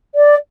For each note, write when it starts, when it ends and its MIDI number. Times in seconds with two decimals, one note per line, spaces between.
0.15 0.35 74